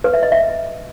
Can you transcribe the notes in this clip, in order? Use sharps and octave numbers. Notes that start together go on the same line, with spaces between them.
B4
E5
D#5
E5